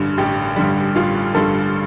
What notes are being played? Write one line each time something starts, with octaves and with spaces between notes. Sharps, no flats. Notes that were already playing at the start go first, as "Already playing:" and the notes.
Already playing: A1 G2 D3 G3
A1 G4
G2 D3 G3
A1 F4
G2 D3 G3 A4